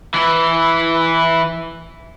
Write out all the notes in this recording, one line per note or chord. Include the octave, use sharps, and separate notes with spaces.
E3 E4